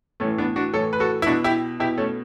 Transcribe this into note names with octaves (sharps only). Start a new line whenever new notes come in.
A2 E3 A3 C#4
B3 D4
D4 F#4
A2 E3 A4 C#5
B4
F#4 A4
E4
B2 D4 F#4
E4 G4
B2 E4 G4
A3 C#4